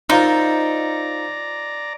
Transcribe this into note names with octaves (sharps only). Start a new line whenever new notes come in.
C4 D#4 F4 A#4 D5 A#5